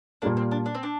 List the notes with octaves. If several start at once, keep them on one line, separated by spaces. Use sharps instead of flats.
A#2 G3 A#3 D4
C4
D4
D4
C4
D4